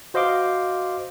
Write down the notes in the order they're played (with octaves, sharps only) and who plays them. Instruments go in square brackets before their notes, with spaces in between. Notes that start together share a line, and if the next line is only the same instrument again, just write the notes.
[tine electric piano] F#4 C5 D#5 F5 C6 D6